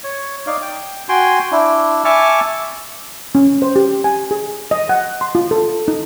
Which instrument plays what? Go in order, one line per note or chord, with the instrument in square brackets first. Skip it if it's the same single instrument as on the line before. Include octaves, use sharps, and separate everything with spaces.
[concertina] C#5
D#4 D5 F5
G5
F#4 G5 G#5 C6
D4 E4
E5 G#5 A5 C#6 D6 F6
[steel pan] C#4
C5
G4
G#5
G#4
D#5
F#5
C6
F4
A4
D#4